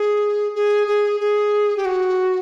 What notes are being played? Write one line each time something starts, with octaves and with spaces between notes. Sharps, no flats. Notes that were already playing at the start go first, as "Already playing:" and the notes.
Already playing: G#4
G#4
G#4
G#4
G4
F#4